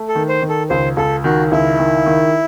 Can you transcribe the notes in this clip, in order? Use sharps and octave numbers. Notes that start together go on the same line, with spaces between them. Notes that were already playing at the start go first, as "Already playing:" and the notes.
Already playing: A3
A4
D#3
C5
D#3
A4
C#2 C5
C#2 A4
D#3 F#4
C#2 E4
D#3
D#3